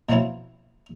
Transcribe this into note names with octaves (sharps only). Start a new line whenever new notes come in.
B2 F3 F#3 C4 E4 F4